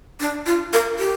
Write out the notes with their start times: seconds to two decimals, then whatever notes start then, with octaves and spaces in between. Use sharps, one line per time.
0.20 D4
0.46 F4
0.73 A#4
0.99 G4